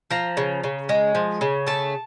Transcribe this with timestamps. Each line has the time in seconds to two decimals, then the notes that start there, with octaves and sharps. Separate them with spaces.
0.11 F3 A#5
0.37 C#3
0.64 C#3
0.89 G#3
1.15 F3
1.41 C#3
1.67 A3 A5